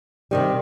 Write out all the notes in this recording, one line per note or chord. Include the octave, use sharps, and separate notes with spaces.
C3 D#3 G3